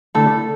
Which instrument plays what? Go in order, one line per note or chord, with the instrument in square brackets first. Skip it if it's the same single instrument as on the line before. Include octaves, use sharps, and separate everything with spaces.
[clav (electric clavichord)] D3 A3 E4 [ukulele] A4